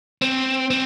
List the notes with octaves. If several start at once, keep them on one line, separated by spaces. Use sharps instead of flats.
C4
C4